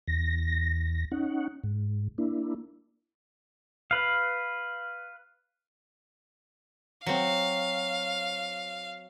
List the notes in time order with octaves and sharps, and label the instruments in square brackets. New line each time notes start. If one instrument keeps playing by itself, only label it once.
[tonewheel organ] E2 A#6
C#4 D#4 F#5
G#2
A#3 D4 E4
[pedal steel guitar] B4 F5
[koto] F#3 C4 [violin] F5